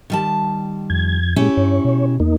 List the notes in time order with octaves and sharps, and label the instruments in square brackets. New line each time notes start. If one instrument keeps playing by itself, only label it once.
[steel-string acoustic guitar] D#3 G3 A5
[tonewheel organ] F2 G#6
[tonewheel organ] A#2 G#3 [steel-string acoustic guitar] C#4 E4 G4
[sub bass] G2 [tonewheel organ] C#5
[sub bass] B2
[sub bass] E2 [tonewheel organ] A#3 D#4